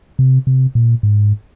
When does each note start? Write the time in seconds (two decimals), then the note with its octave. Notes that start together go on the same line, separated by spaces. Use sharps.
0.19 C3
0.47 C3
0.75 A#2
1.03 G#2